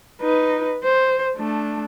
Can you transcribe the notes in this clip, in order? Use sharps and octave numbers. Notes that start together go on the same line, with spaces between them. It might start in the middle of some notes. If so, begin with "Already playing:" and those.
D#4 B4
C5
A3 D4